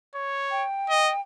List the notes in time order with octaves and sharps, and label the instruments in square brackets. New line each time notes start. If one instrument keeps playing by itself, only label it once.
[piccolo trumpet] C#5
[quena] G5
[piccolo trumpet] D#5